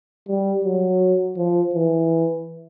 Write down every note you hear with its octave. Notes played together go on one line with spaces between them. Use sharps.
G3
F#3
F3
E3